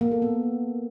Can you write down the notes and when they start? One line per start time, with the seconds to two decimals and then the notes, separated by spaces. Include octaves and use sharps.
0.01 A#3
0.12 A4
0.22 B3